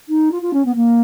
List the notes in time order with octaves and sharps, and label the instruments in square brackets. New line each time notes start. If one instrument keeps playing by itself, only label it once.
[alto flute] D#4
F4
F4
C#4
B3
A#3